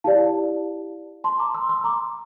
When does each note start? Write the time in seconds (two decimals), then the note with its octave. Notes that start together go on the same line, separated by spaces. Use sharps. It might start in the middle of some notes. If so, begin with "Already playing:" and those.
0.04 E4 G4 D5 F5 A5
1.24 A5 C6
1.39 A#5 D6
1.54 C6 E6
1.69 C6 E6
1.84 A#5 D6